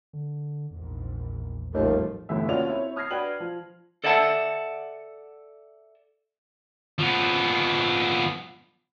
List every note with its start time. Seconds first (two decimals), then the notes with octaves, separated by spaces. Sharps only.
0.13 D3
0.71 A#1 E2 G#2
1.74 A1 D#2 F3 G3 A3
2.29 G1 C2 A2 E3 A3 E5
2.48 D#2 C#4 F4 F#4 D5 F7
2.67 C4 E4 C#5
2.96 D#6 F6 G#6 A#6 C7
3.10 D4 F#4 B4 G5 F#7
3.40 F3
4.04 A4 D5 E5 F#5 A5
6.99 F3 B3